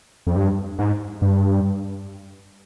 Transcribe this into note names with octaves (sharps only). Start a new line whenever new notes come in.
F2
G2
G#2
G2